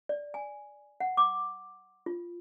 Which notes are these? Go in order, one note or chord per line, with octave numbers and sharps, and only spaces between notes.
D5
G#5
F#5
D6
F4